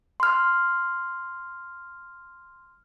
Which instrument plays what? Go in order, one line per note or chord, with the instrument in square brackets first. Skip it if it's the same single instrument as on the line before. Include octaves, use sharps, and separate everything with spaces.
[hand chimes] C6 F6